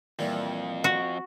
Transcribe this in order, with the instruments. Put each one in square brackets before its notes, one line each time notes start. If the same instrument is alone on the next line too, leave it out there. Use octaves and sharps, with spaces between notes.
[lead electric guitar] F2 [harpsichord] A#2 E3 G3
[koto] F#4